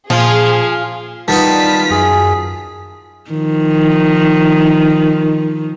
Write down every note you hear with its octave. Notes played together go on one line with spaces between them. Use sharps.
A#2 F3 F4 G#4
D#3 G3 B3 D#4 F4 A5 B6
F#2 G#4
D#3 F3